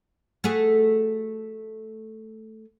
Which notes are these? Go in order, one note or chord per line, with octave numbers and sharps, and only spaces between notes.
A3 F#4 G#4